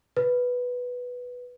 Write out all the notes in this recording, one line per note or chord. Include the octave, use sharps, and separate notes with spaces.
B4